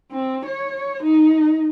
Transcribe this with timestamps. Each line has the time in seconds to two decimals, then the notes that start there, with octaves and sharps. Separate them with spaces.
0.11 C4
0.46 C#5
1.03 D#4